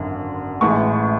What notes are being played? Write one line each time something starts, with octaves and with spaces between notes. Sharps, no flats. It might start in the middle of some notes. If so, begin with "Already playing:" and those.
Already playing: G#1 F#2 D3
A1 A2 E3 G#3 C#6